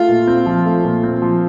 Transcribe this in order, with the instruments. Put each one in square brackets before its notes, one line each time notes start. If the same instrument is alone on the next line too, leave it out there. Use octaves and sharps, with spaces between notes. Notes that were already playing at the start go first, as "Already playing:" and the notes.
Already playing: [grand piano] A3 [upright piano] F4
[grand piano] A#2
C4
F3
A3
A#2
C4
F3